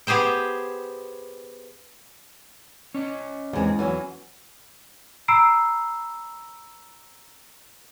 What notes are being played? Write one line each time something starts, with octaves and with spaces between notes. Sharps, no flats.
B3 G4 G#4 C5 G5
C#4 D#5
E2 G#3 C4
E2 E3 F#3 C#4
A#5 B5 E6 C7 D7